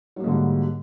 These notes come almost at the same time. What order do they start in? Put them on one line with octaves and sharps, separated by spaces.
F#3 A#3 G#2 D3 G3